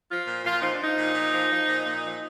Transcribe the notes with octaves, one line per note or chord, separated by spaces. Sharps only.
F3 F4
A#2
A#2 F4
F3 D#4
D4
F3 D#4
A#2
A#2
F3
F3
A#2
A#2
F3